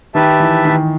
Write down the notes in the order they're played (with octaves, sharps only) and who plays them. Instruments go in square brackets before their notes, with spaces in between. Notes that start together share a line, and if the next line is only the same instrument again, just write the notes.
[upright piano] D#3 [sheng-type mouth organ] G4 B4 E5 A5
[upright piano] E3
D#3